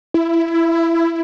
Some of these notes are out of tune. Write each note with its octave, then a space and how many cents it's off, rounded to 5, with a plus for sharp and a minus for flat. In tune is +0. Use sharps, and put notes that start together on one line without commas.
E4 +15